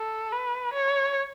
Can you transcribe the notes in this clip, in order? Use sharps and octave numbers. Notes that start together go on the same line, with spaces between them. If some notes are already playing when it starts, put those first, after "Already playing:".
Already playing: A4
B4
C#5